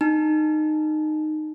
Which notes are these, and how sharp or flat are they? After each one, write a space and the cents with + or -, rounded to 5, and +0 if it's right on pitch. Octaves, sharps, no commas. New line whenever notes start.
D#4 -15 A5 +35